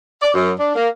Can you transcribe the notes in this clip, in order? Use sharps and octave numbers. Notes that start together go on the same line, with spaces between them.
D5
F#2
D4
A#3